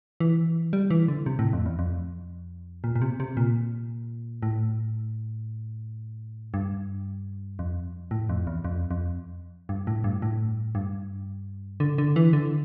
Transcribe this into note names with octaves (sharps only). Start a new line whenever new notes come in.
E3
G3
E3
D3
C3
A2
F2
E2
F2
A#2
A#2
C3
C3
A#2
A2
G2
F2
A2
F2
E2
F2
F2
G2
A2
G2
A2
G2
D3
D3
E3
D3